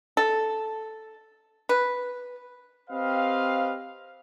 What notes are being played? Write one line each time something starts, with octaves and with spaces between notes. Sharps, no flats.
A4
B4
C4 G4 B4 D#5 F5